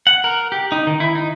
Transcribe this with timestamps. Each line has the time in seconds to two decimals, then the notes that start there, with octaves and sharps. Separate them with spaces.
0.07 F#5
0.24 A#4
0.52 G4
0.72 D#4
0.87 D#3
1.00 E4
1.15 D#4